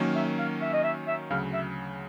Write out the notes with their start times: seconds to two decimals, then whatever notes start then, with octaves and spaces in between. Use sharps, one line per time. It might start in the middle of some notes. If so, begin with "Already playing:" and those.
Already playing: D#3 F#3 A#3 C#4
0.15 E5
0.39 F5
0.61 E5
0.73 D#5
0.84 E5
1.07 E5
1.30 D2 C#3 F#3 F5
1.53 E5